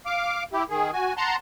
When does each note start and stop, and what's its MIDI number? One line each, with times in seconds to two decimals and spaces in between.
0.06 0.44 77
0.06 0.44 86
0.53 0.64 64
0.53 0.64 67
0.69 0.91 51
0.69 0.91 68
0.93 1.13 66
0.93 1.13 80
1.17 1.36 78
1.17 1.36 81
1.17 1.36 82
1.17 1.36 84